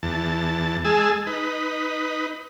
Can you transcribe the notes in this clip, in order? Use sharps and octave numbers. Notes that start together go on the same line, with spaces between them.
E2 A5
G#3 G#4 A5 E6
D#4 B4